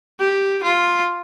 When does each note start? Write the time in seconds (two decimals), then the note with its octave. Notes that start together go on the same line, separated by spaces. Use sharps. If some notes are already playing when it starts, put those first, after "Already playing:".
0.20 G4
0.63 F4